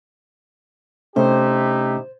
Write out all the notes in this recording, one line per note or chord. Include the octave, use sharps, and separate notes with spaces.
C3 A3 C#4 D#4 E4 G4 C5